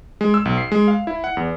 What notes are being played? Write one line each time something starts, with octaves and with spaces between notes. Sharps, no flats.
G#3
E6
B1
C7
G#3
F5
E4
F#5
E2